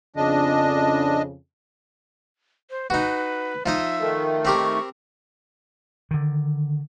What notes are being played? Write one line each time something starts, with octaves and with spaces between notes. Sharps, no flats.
F2 C#3 D4 D#5
C5
D#4 F#4 B4
F3 D#4 D#5 E5
D#3 A3
C4 G4 A#4 C#6
D3 D#3